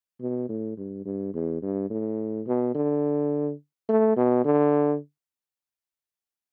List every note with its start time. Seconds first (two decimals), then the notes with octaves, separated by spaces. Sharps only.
0.21 B2
0.49 A2
0.77 G2
1.06 G2
1.34 E2
1.62 G2
1.90 A2
2.47 B2
2.75 D3
3.89 A3
4.17 B2
4.45 D3